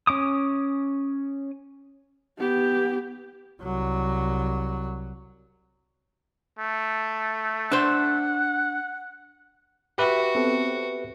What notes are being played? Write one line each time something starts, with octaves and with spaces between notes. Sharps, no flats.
C#4 D6 D#6
B3 G4
C2 F#3
A3
D4 C5 F#5
F#4 G4 B4 E5
B3 C4 A4